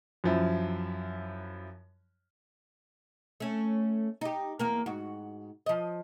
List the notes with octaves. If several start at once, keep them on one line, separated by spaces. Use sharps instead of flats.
F#2 F3 E4
A3 C#4
D#4 G4
E2 A#3 A#4
G#2 F#4
F3 D#5